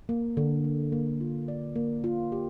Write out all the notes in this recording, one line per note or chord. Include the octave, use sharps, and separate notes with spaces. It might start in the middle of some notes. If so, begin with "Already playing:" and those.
A#3
D3
A#3
A#3
F4
D5
A#3
F4
G4